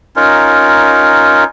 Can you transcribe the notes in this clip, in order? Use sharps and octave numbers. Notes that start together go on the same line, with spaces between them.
C#4 D#4 F4 A#4